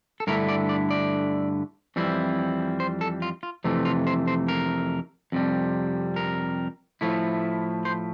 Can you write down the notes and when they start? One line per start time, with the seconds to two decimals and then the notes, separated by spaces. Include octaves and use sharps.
0.20 A4
0.27 G2 D3 A3 E4 A#4
0.49 D5
0.69 D5
0.91 D5
1.96 F2 E3 G3 C4 E4
2.80 C5
3.01 A4
3.22 F4
3.43 F4
3.64 F2 C3 E3 A3
3.85 F4
4.07 C5
4.27 C5
4.48 A#4
5.32 F2 C3 G3
6.16 A#4
7.01 A2 F3 A3 E4
7.85 C5